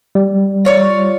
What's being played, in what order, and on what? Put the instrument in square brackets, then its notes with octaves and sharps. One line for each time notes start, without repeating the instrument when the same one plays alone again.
[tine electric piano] G3
[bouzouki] F4 C#5 D5